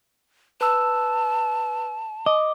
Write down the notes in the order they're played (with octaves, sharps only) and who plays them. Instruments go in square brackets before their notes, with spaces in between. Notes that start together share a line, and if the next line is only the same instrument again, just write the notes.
[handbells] B4 E6 [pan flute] A5
[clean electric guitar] D#5 [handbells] D6